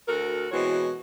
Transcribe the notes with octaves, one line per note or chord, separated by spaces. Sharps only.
D2 F#4 A4 A#4
B2 E3 G#3 C4 F#4 C#5